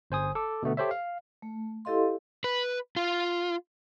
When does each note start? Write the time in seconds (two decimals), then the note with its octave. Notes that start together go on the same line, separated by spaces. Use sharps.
0.11 G1 C5 G#5 D#6
0.35 A4 D6
0.63 B2 D3 A3 B3
0.77 G4 A4 C5 C#5 E5
0.91 F5
1.42 A3
1.85 E4 G4 A4 D#5 F5 C6
2.44 B4
2.96 F4